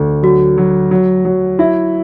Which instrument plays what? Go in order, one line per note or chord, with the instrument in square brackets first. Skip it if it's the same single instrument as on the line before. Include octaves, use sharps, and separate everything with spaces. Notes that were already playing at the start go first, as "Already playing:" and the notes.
Already playing: [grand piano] D2 [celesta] A4
[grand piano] F#3 [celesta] F#4
[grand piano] F#3
F#3
F#3
[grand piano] E4 [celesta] E5